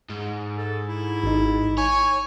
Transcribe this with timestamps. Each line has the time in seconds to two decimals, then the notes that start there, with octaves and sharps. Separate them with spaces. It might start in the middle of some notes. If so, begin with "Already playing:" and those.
0.10 G#2
0.57 A4
0.88 E4
1.24 G#1 D#4
1.78 C#5 G#5 C#6